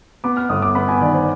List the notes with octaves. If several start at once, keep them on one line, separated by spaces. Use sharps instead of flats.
B3 D6
F6
G1 D#6
D6
B3 B5
G#5
D#3 D5
C5